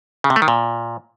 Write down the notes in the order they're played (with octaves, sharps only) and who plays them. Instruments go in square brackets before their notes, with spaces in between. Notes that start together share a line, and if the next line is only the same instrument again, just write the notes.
[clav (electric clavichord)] C#3
C3
A3
D#3
A#2